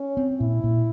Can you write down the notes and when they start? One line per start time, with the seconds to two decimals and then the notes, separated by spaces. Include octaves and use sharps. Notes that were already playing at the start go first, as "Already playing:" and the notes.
Already playing: C#4
0.17 C4
0.40 A#2 E4
0.64 A#2